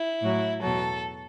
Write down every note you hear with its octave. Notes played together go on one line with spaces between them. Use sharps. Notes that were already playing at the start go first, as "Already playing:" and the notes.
Already playing: E4
A2 F#3
E2 B2 F#3 A4